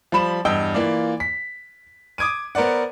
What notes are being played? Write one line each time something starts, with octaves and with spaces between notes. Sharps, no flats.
F3 G3 B5 E7
E2 G2 D#5 G5 E6 G7
E3 A#3 F4 D5
B6
D6 D#6 G#6 D7 D#7
B3 A#4 C5 D5 F#5